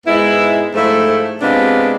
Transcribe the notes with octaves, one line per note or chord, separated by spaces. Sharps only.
G#2 G#3 B3 E4
G#2 F3 A3 E4
C3 G#3 B3 D4 F4